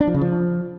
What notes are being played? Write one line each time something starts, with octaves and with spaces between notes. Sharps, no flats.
D4
F3
C#3
F3